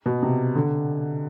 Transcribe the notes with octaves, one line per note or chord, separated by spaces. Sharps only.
B2
C3
D3